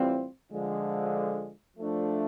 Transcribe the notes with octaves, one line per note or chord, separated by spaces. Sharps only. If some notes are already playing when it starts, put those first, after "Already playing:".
Already playing: A2 E3 G3 C4 F4
D3 F3 G#3
F3 A3 D4